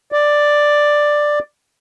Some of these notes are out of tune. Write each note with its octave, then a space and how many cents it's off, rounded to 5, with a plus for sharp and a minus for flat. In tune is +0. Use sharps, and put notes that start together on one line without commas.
D5 +5